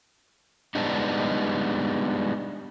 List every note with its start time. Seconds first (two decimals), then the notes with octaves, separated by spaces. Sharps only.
0.75 G3 G#3 B3 D4 D#4